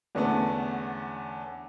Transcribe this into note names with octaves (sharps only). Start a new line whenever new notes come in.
E2 D3 A3 B3 C#4